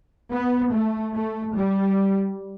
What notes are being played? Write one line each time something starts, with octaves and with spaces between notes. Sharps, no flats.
B3
A3
A3
G3